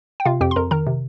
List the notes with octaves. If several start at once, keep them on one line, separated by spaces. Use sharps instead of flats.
G5
C3 F4 F5
F2 G4 G5
C6
F2 A#4 A#5
D#3 A#4 A#5
C3